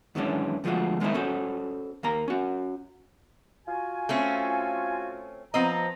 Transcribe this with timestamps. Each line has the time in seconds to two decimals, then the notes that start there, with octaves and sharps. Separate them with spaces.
0.15 F#2 D#3 E3 G#3 C#4 D4
0.64 D2 F3 G#3 A3 F4 F#4
1.00 D#3 G#3 A#3 D#4 E4 C5
1.14 C#4 F#4 A4 C5
2.03 D#2 A#3 A#5
2.28 C#4 F#4
3.67 F4 F#4 G#5
4.09 A3 C4 C#4
5.54 F3 B3 C4 D#5 A#5